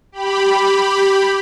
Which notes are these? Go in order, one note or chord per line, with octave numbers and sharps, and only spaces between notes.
G4 B5